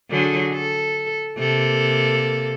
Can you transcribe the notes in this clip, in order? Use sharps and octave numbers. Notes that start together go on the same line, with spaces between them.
D3 F#3 G#4
A4
C3 A#3 A4